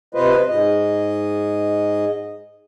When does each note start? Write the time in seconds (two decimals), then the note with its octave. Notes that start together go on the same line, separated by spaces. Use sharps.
0.15 C3 F4 B4 C5 D#5
0.49 G#2 D#5